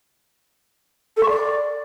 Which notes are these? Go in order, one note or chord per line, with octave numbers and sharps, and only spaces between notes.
A4
C#6
D5